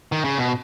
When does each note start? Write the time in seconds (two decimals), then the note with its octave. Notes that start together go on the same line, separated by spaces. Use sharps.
0.12 D#3
0.24 C#3
0.38 B2